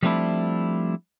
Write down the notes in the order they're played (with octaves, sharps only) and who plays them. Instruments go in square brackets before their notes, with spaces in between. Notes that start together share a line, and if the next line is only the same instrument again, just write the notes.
[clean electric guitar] F3 G3 A3 C4 D4 E4